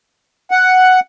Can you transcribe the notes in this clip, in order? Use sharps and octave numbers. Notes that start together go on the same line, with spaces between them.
F#5